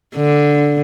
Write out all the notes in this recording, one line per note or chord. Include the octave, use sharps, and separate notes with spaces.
D3